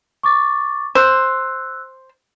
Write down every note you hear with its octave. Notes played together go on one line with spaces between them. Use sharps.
C#6 D6 A6
C5 E6 F#6